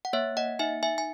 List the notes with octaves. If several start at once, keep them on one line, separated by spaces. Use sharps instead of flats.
F#5
A#3 C#5 E5
D#5 F#5
D#4 E5 G#5
E5 G#5
G#5